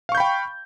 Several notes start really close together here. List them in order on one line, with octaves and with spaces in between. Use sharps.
F5 C#6 G6 B5 G5